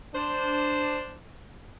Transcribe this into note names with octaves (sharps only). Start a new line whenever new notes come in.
D4 C5